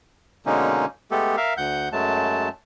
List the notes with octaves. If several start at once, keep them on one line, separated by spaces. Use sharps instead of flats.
B2 D3 G#3 A#3 C#4 D#4
G#3 A3 B3 G4 A4
A#4 E5 F5
D2 F#5 G6
F#2 F#3 G#3 A3 A5